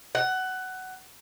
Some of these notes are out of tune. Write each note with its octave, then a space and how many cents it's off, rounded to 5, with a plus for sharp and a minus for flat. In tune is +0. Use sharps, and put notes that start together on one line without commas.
F#5 +15